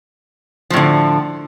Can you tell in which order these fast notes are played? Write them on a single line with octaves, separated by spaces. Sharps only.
F3 A2 D3